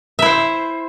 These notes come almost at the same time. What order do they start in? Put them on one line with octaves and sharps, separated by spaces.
E5 E4 C5